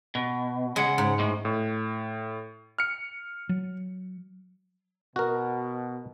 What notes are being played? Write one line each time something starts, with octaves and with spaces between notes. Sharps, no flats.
B2
C#3 G#3 F#5
G#2
A2 G#3
A2
F6 C#7
F#3
B2 F#4 A#4